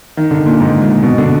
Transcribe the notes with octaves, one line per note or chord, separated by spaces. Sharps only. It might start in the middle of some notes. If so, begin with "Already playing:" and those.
D#3
D3
A#2
G#2
A#2
B2
D3